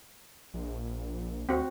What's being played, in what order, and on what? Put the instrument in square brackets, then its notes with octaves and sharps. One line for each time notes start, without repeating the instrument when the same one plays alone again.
[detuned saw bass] A#1
[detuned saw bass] D2 [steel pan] C4 F#4